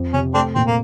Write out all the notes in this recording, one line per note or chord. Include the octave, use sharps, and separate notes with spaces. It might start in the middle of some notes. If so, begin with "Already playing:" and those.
Already playing: F2
C3 C#4
A3 C4 D4
A#2 C4
A#3